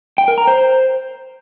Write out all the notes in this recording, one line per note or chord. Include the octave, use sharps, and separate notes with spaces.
G5
A#4
A#5
C5